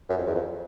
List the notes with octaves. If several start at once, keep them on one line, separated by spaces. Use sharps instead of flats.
F#2
F2
E2
F2